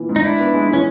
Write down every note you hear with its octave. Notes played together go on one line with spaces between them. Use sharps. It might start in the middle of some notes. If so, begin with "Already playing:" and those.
Already playing: A#1 E3
G#2
D#4
G#2 D4 E4
B3
G#3
E3 C#4